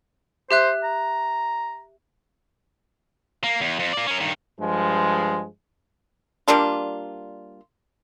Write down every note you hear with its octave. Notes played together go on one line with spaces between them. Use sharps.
G4 C5 E5 F#6
A#5
A#3
E2
F2
A#3 D5
C#4 A#4
G2 D#3
G2 F3 G#3
G3 A#3 D4 F4